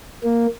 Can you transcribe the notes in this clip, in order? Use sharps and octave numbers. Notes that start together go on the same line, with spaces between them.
A#3